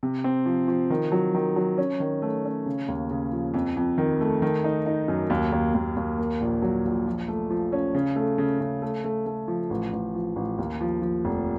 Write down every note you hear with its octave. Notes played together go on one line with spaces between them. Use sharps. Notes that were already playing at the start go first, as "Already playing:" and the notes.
C3
C4
F3
F3
D#3
F#3
D#3
F#3
C#4
D#3
A3
C#4
C#3
D#2
C#3
F3
F2
F2
D#3
A3
D#3
D#4
D#4
F#2
D#2
D#2
D#2
D#2
A#3
A#1
F#3
A#1
F3
A3
F3
C#4
C#3
A3
C#3
C#3
A3
A3
A3
F3
A1
A1
F3
A1
D#2
F3
F3
F1